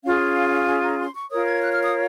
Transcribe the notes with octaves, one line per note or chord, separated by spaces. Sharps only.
C#4 F4 G#4 F5
G#5
A#5
C6
C#6
F4 A#4 C#5 D#6
G#6
F#6
F6
D#6